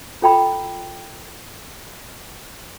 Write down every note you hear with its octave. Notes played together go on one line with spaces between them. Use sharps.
F4 A4 G5 A#5 B5